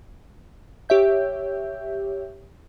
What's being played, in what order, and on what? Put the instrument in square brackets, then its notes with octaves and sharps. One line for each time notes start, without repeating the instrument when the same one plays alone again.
[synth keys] G4 C#5 E5 G6